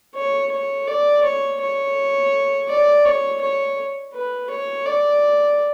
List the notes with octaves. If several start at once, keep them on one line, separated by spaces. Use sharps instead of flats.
C#5
C#5
D5
C#5
C#5
D5
C#5
C#5
B4
C#5
D5